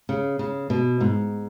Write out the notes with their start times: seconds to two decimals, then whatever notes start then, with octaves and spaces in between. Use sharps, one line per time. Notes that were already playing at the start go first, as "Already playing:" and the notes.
0.09 C#3
0.39 C#3
0.70 B2
1.00 G#2